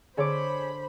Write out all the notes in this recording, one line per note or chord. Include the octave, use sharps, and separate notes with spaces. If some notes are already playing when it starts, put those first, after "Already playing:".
D3 G#4 C5 C#5 B5 D6